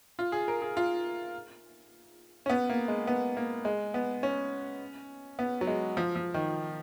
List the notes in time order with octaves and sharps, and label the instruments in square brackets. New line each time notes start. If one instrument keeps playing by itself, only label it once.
[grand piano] F4
G#4
A#4
G#4
F4
C#4
B3
A#3
G#3
B3
A#3
G#3
B3
C#4
B3
F#3
G#3
F3
F3
D#3